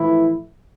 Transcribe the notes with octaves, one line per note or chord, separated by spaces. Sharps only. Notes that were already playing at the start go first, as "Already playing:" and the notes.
Already playing: A2 E3 F3 A3 E4